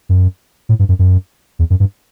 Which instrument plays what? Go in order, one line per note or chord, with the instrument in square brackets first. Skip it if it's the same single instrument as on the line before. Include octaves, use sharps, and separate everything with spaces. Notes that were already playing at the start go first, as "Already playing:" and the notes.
[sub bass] F#2
A2
G2
F#2
F#2
E2
F#2
G2